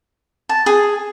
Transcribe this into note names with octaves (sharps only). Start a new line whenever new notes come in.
A5
G#4